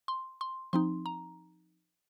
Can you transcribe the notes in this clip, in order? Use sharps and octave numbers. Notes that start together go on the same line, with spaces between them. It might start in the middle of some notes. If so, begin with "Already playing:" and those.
C6
C6
F3 C4 D#4 C6
A#5